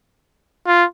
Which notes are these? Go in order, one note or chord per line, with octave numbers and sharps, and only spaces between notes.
F4